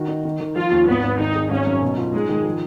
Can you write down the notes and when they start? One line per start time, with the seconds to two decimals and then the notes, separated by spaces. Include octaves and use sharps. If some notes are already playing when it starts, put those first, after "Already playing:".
Already playing: D#3 F#4
0.08 D#4
0.25 D#3
0.40 D#3
0.56 F3 F4
0.71 D#2
0.87 G#1 B3
1.04 G#1
1.19 D#3 D#4
1.35 G#3
1.51 G#1 C#4
1.67 F#2
1.82 B2
1.98 F4
2.13 G#2 G#3
2.29 D#3
2.45 F3